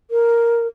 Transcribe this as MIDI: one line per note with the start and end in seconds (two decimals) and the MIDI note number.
0.11 0.67 70